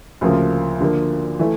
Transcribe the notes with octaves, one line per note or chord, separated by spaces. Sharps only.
D2 C#3 F3 A#3
D3 F3 A#3
E3 A3